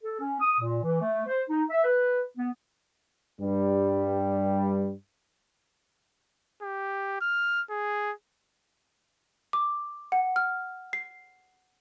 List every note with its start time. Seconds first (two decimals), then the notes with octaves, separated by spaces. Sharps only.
0.03 A4
0.19 C#4
0.41 D#6
0.59 A#2
0.83 E3
1.01 A3
1.27 C5
1.49 D#4
1.69 E5
1.84 B4
2.37 B3
3.40 G2 G3
6.62 G4
7.21 F6
7.70 G#4
9.53 D6
10.12 F#5
10.36 F6
10.93 C7